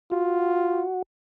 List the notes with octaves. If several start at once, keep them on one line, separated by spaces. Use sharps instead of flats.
F4 F#4